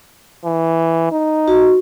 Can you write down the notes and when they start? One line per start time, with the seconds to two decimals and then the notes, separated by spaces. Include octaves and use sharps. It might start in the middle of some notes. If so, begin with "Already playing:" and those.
0.44 E3
1.12 D#4
1.48 F#4